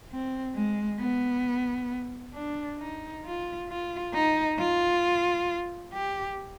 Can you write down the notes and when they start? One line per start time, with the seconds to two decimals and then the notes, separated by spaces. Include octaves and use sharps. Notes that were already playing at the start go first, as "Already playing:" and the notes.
0.11 C4
0.55 G#3
1.00 B3
2.34 D4
2.80 D#4
3.25 F4
3.69 F4
4.14 D#4
4.59 F4
5.93 G4